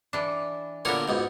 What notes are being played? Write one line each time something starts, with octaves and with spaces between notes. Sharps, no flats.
E3 D4
A#2 D3 B3 F#4 A#4 C#5
C#2 G#2 B2